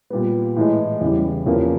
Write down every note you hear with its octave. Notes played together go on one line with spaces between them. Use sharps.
A#2 G3 B3
A2 E3 G#3
E2 C#3 E3 G3
E2 C#3 F3 A#3